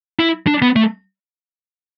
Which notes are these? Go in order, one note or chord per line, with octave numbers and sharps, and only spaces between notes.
E4
D4
B3
A3